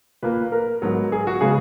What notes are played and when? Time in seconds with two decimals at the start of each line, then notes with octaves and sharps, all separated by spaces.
0.23 A#2 A#3 B4
0.52 A#4
0.82 G#2 F#3 B3
1.12 G#4
1.27 F#4
1.41 C#3 G#3 B3 G#4